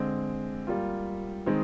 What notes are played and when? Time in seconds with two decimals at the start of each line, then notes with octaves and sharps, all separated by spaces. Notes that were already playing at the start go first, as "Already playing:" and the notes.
Already playing: D3 G#3 C4
0.67 G3 A#3 F4
1.46 D#3 G#3 C4